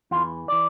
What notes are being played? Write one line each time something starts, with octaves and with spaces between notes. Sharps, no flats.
E2 E3 F4
E3 D5